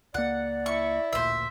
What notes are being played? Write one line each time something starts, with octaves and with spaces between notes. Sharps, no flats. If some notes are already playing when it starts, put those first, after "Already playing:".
C#2 A#3 D5 F#5
E4 C#6
A1 D2 A#2 C5 E5